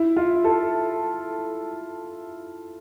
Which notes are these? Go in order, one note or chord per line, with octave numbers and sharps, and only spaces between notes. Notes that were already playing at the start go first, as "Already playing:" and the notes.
Already playing: E4
F4
A4